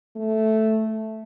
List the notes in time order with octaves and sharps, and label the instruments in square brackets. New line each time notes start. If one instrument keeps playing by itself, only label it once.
[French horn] A3